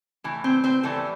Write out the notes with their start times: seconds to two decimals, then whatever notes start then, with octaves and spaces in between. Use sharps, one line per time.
0.24 A2 E3
0.44 C4 C5
0.64 C4 C5
0.83 A2 E3 G3 A3 A4